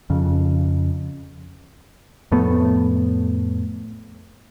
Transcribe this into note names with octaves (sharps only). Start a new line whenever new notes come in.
F2 C#3
F2 A2 A3 B3